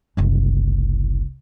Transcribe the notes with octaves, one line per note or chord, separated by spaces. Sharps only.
F#1 C2